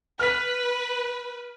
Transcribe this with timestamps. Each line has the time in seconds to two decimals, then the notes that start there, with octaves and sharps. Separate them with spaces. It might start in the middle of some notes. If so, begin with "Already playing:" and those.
0.19 B4 F6 B6